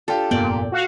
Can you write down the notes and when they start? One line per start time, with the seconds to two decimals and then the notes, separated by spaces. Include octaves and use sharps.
0.08 D4 F4 G4 A4
0.31 F1 G2 A#2 B3 D5 G5
0.72 F#4 F5 F#5